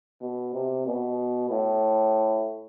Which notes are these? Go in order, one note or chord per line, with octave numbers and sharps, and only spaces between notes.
B2
C3
B2
A2